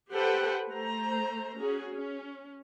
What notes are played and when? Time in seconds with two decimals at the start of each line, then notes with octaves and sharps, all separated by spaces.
0.12 G4 A4 B4 C5 F#5 G5
0.69 A3 C5 A#5
1.59 C#4 F#4 G#4
1.93 C#4